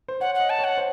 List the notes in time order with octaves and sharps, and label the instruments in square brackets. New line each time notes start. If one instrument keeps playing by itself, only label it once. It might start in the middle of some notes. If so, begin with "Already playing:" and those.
[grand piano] C5
[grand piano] C#5 [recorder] F#5
[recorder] F#5
[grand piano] D#5
[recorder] A5
[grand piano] C#5 [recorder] F#5
[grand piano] C5